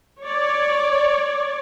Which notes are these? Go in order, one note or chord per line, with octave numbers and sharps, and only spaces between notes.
C#5 D5